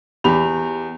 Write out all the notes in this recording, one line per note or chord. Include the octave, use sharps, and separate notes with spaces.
E2 G4 B5 F7